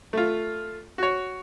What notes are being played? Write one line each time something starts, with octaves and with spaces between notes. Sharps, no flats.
A3 F4
F#4 C#5